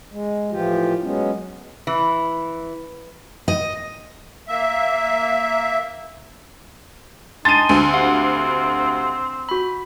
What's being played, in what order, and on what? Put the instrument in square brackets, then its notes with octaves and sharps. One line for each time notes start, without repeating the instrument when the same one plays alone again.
[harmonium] G#3
A2 E3 F3 F4 G4
F#3 G#3 B3 C#4
[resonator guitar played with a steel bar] E3
[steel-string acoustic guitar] D#5
[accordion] A#3 E5
[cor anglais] D#4 [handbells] G#5 A5 C6 [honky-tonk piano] A6 D#7
[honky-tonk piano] D2 [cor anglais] C4
[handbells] G4 F5 F#5
F#4 B5